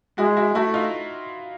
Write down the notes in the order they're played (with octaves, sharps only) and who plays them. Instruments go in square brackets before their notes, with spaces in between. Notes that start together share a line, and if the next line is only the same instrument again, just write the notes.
[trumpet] G#3 [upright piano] E4 F#4
[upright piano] E4 F#4
[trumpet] A3 [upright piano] E4 F#4
[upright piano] D#4 F4